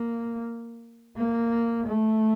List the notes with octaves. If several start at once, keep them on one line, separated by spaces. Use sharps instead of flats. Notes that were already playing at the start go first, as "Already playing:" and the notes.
Already playing: A#3
A#3
A3